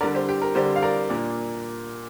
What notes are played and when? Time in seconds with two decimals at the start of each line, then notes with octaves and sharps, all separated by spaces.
0.01 D3 A#4 D5
0.04 G3 D4
0.15 G4 C5
0.29 G4
0.42 A#4
0.55 D3 G3 D4 G4 C5
0.76 F5
0.82 A#4 D5
1.09 A#2 A#3 D4